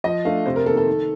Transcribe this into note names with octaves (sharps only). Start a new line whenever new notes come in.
F3 D#5
A3 D4 F5
C3 C5
A#4
D#3 A#3 A4
A4
D#3